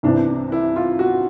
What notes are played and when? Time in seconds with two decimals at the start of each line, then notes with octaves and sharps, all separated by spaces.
0.03 C2 C3 E3 D4
0.52 E4
0.76 F4
0.99 F#4